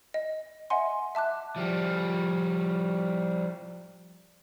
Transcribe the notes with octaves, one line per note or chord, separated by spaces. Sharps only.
D#5
D#5 E5 F#5 G#5 C6
E5 A5 D6 F#6
F3 G3